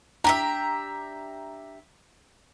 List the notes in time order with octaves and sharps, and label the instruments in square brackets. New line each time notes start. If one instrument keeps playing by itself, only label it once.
[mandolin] D4 G4 E5 [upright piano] A#5